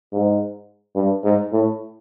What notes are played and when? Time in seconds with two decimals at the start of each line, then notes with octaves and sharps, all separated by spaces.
0.13 G#2
0.96 G2
1.24 G#2
1.52 A2